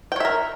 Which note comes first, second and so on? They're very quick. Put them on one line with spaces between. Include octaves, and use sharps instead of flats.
G5 C#5 E5 A#4